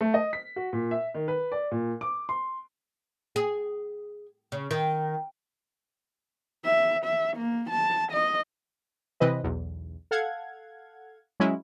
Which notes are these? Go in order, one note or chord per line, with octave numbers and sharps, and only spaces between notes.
A3
D#5
B6
F#4
A#2
E5
D#3
B4
D5
A#2
D6
C6
G#4
C#3
D#3
E5
E5
A#3
A5
D#5
C3 E3 C4 B4 D#5
B1 E2
A4 F5 F#5 G#6
F#3 G#3 C#4 E4